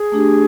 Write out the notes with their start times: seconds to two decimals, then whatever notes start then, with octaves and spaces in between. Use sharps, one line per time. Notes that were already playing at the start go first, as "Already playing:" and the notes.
Already playing: G#4
0.12 A3 D4 G4